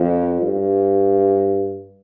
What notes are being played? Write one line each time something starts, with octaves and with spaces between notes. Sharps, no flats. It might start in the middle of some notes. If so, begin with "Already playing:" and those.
Already playing: F2
G2